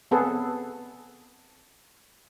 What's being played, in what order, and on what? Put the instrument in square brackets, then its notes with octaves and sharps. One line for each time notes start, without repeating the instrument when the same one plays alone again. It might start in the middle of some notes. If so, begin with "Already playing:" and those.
[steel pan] B3 C4 G#4 A4 B4 F#5